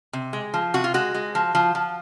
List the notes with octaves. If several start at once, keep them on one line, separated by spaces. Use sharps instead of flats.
C3
G#3
F3
C3 F#4
F4
G#3 F#4
G#3
F3
F3
F3